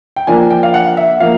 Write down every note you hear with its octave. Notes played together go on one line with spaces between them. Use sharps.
G5
F3 A#3 D4 F4 G#5
G5
F5
F#5
E5
F3 A#3 F5